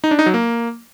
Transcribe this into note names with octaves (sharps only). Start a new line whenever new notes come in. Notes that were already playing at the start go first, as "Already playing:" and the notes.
D#4
D4
D#4
F#3
A#3